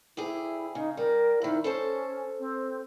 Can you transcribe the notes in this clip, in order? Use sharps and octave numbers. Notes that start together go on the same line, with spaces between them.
D2 E4 G4 G#4
C#3 D#4
G3 A#4
F2 D#3 E4
C#4 A4 C5 A5
C4